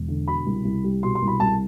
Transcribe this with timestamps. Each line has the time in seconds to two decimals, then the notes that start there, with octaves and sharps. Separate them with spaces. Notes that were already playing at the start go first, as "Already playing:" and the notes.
Already playing: E1
0.08 D3
0.27 B2 B5
0.46 C2
0.65 C2
0.84 G3
1.03 B2 C6
1.15 C6
1.22 C2
1.28 B5
1.40 C2 A5